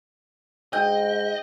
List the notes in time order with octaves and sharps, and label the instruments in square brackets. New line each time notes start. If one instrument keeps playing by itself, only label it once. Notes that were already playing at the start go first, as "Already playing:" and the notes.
[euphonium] G#2 [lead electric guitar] D#5 [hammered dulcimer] G5